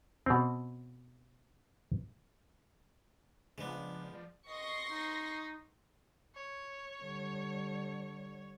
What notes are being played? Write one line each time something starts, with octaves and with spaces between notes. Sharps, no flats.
B2 C4
C#3 F3 G#3 B3 D4
F3 D5
D#5 C6 C#6 A#6
D#4
C#5
D3 G3